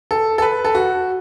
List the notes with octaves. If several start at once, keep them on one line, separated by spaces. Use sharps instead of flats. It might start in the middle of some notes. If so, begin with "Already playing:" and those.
A4
A4
B4
A4
F#4